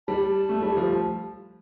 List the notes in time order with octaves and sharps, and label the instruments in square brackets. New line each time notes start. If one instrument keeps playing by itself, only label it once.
[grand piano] G3 [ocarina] A5
[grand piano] A3
G3
F3